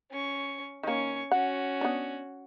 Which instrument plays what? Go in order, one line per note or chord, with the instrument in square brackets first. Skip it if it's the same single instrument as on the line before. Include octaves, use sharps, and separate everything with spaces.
[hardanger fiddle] C#4 C#6
[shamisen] D#3 A#3 [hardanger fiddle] C#4 C#6
[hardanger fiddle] C#4 F#4 [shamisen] F#5
[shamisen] B3 D4